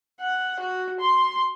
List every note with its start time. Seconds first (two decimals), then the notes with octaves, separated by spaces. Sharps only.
0.21 F#5
0.60 F#4
1.00 C6